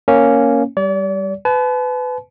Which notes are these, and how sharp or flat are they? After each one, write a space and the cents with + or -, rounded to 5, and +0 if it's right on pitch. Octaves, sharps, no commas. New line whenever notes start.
A#3 +0 C#4 +0
G3 +0 D5 -40
B4 +25 A5 -40